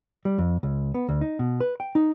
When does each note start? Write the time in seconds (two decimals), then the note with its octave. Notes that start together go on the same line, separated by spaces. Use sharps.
0.25 G3
0.38 F2
0.63 C#2
0.94 B3
1.09 D2
1.21 D#4
1.39 B2
1.60 B4
1.80 G5
1.95 D#4